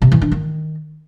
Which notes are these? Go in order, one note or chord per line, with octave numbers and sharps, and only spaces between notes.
C3
E3
D4
D#3